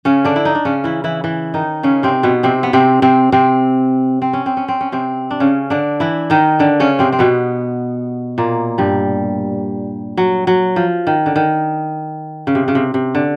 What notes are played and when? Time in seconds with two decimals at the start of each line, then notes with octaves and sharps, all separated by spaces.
0.05 C#3 C#4
0.24 D3 D4
0.36 E4
0.45 D#4
0.55 D4
0.65 C#3 C#4
0.84 E3 E4
1.04 E3 E4
1.24 E3 E4
1.54 D#3 D#4
1.83 C#3 C#4
2.03 C3 C4
2.23 B2 B3
2.43 C3 C4
2.63 B3
2.73 C3 C4
3.02 C3 C4
3.32 C3 C4
4.22 C4
4.33 C#4
4.46 C4
4.57 C#4
4.68 C4
4.81 C#4
4.92 C3 C4
5.31 D4
5.40 C#3 C#4
5.70 D3 D4
6.00 E3 E4
6.30 D#3 D#4
6.59 D3 D4
6.80 C#3 C#4
6.99 C3 C4
7.12 C4
7.19 B2 B3
8.38 A#2 A#3
8.78 G2 G3
10.17 F#3
10.47 F#3
10.76 F3
11.07 D#3
11.26 D3
11.36 D#3
12.47 C#3
12.55 C3
12.68 C#3
12.75 C3
12.94 C3
13.15 D3